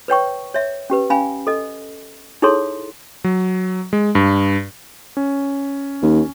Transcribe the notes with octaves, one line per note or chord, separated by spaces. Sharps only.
B4 C#5 G5 C#6
C#5 E5
C#4 G4 B4
C#4 F5 G#5 B5
A4 D#5
D#4 E4 G#4 A4 C#5 C6
F#3
G#3
G2
C#4
D#2